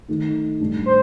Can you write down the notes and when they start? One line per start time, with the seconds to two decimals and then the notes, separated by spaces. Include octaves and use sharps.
0.09 D#3 A3 D#4
0.60 A2 G3 D4
0.86 C5